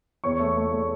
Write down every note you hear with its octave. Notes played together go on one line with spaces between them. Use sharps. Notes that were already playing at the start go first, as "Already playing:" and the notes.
E2 C#5 C#6
A3
A3
A3